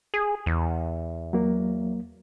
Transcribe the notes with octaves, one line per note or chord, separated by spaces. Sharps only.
G#4
E2
F#3 A#3